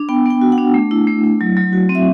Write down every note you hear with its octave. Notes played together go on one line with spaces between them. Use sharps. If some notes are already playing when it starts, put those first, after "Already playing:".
Already playing: D4
B3 G5
B3 G5
F#4
F#5
D4
A3
E4
A3
E4
F#3
F#3
F#4
C4
E5